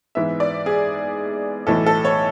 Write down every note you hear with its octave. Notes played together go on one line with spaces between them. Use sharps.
G#2 E3 B3 E5
D5
G#4
B1 A2 E3 A4
A4
C#5